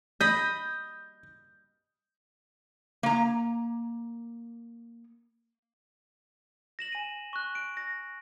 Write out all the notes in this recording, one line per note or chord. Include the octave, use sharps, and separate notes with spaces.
D#5 B5 G6
A#3 A#5
A#6 E7 F#7
G#5 D#7
C#6 F#6
D7
A#6